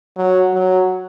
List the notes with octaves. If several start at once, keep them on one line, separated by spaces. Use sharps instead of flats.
F#3
F#3